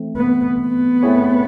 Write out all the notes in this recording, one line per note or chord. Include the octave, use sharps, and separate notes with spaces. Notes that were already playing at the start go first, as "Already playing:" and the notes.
Already playing: E3 A3 C4
B3
B3
A3 C4 E4 G#4 C#5